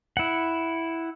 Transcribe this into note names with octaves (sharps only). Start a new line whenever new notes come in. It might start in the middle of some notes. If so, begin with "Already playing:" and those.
E4 F#5